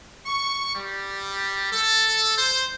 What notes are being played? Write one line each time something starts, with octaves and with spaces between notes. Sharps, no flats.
C#6
G3
A4
C5